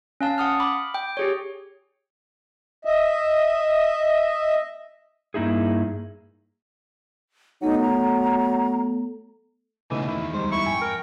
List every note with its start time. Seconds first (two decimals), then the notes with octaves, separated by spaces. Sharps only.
0.21 C#4 F5 A5
0.38 F#5 D#6 F6
0.60 B5 D6
0.94 G5
1.17 G4 G#4 C#5
2.85 D#5 E5
5.34 G2 A#3 D#4 E4 G#4
7.62 F#3 A3 B3 D#4 A4
7.81 A#5
9.91 C#3 E3 A3 B3 D#4
10.08 E2 D#3 E4
10.33 D2 G3 G#3 C5
10.52 E4 C#6
10.67 F2 G#2 G5 G#5
10.82 A#4